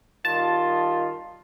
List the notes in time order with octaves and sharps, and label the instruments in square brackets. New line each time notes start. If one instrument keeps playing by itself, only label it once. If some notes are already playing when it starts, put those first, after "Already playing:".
[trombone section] D#3 G3 F4 [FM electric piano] A5